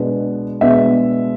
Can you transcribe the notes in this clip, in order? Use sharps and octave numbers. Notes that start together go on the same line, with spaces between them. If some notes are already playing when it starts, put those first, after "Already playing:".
Already playing: B2 G#3 B3 D4
B2 G#3 B3 D4 E5